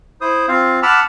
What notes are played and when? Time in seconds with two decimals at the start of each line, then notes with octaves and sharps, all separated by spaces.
0.21 E4 C5 D#6
0.48 C4 F4 F5
0.83 F#5 A5 B5 D6 E6 F6